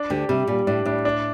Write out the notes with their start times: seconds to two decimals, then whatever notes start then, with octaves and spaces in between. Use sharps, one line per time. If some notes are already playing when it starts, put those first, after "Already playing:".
Already playing: D4
0.10 D2 D3 G4
0.29 C3 G3
0.47 A#2 G3
0.67 A2 D4
0.85 A2 D4
1.05 D4